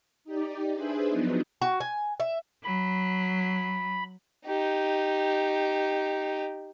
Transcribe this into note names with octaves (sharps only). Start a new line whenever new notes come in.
D#4 G4 D5
D4 G#4 B4 C5 E5 B5
F3 F#3 B3 D4 D#4
F#4
G#5
E5
F#3 B5
D#4 G4